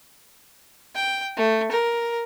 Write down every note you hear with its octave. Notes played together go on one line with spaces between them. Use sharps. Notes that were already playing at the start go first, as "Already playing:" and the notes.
G5
A3
A#4